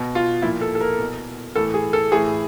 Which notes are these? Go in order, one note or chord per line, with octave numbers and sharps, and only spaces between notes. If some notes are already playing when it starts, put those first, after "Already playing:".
Already playing: B2
F4
A#2 F3 E4
A4
A4
A#4
B2
A2 E3 A4
G#4
A4
A2 E3 G#4